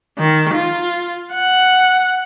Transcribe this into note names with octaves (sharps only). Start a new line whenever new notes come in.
D#3
F4
F#5